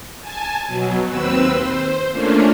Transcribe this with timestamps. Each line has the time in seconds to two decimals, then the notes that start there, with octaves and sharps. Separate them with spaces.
0.21 G#5 A5
0.67 B2 F#3
1.08 D#2 C4 B4 E6
1.56 C5
2.12 A3 A#3 C#4 D4 F4